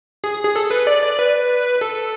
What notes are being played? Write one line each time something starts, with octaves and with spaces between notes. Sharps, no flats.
G#4
G#4
A4
B4
D5
D5
B4
A4